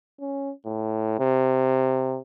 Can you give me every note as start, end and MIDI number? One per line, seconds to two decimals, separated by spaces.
0.20 0.52 61
0.66 1.16 45
1.19 2.19 48